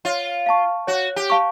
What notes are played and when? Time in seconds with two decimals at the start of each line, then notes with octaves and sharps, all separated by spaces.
0.05 F4 C#5
0.46 F5 A5 C#6
0.87 F#4 C#5
1.16 G4
1.30 F5 A5 C#6